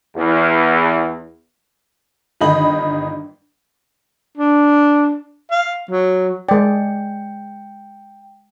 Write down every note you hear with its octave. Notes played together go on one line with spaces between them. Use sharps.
E2
G1 D#3 D#5 B5 F#7
D4
F5
F#3
G#3 D5 G5